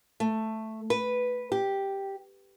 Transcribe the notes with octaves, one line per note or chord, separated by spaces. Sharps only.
A3
B4
G4